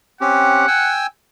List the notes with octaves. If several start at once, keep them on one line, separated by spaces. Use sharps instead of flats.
C4 C#4 G4 F#5
G5 G#5 E6